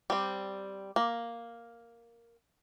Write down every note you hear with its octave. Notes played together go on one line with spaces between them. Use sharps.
G3 C4
A#3